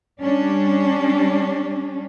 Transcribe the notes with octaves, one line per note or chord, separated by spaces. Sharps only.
G3 C#4 D4